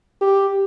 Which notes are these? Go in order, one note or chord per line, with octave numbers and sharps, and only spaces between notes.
G4